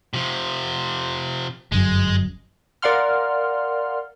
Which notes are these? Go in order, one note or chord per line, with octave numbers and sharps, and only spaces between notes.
C3 F3
G1 F#2 G#3
A#4 D5 F5 F#5 C6 F6